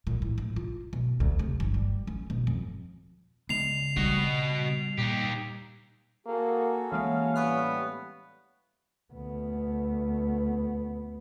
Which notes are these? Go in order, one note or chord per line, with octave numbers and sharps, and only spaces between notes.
A#2
A2
A#1
F4
B2
D2
C3
G1
G3
C#4
B2
F2
C#3 G#3 B3 C7 F7
G3 F#4 D#5
A#2 D#4 G4
A#3 F#4 G#4 A4
E3 G#3 A#3 C#4 F5
A2 G3 B3 F5 B5 C#6
D2 B3